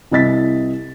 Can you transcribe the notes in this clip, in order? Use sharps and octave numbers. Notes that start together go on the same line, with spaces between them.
C2 E4 D#5 A6 B6